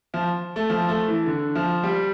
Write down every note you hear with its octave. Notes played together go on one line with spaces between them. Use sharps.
F3
A3
F3
A3
E3
D3
F3
G3